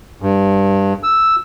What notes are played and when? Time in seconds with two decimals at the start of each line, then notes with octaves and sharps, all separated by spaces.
0.22 G2
1.03 E6